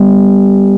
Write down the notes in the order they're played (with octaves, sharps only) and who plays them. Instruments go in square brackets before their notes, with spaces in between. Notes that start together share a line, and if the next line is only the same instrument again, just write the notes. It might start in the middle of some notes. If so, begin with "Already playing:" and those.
Already playing: [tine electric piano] G3 B3 G4